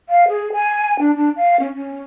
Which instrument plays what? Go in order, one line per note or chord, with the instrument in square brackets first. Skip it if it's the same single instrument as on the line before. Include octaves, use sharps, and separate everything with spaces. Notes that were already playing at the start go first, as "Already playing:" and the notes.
[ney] F5
G#4
G#5
D4
D4
F5
C#4
C#4